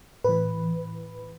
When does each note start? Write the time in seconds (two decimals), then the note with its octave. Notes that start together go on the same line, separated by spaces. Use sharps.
0.24 A2 E3 B4